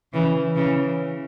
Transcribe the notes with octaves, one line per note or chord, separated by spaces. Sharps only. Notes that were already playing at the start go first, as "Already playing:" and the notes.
C#3 E3
C#3 E3